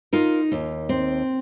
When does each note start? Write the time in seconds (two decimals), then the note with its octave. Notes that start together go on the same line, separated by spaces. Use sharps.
0.13 D#4 F4 A#4
0.52 D#2
0.89 C4